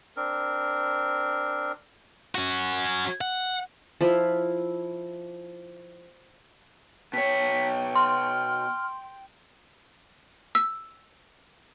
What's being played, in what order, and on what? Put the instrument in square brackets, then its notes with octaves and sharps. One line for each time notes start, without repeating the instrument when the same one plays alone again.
[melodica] C4 D4 A#4
[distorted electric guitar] C#4 F#4
F#5
[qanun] F3 E4
[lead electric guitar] B2 C#5 [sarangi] G5 [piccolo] B6
[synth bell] C6 [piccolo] F6
[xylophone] E6